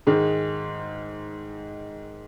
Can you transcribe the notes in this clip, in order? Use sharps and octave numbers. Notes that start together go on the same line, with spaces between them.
G#2 D#3 G#3